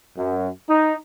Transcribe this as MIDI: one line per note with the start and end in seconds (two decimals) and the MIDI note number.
0.17 0.49 42
0.69 0.95 63